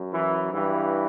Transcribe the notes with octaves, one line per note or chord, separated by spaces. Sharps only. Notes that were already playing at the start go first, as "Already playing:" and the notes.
Already playing: F#2
E3
G2 E3